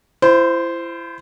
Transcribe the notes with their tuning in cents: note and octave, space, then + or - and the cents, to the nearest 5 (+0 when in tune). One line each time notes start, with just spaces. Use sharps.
E4 +35 C5 -10